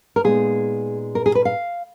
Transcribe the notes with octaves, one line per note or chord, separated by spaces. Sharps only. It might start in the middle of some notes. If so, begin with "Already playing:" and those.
A#4
A#2 G#3 B3 D#4 G#4
A#4
G#4
B4
F5